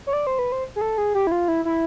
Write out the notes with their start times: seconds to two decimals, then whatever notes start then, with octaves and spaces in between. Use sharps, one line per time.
0.07 C#5
0.13 D5
0.27 C5
0.39 B4
0.52 C5
0.76 G#4
0.81 A4
0.98 G#4
1.15 G4
1.27 E4
1.32 F4
1.48 E4
1.65 E4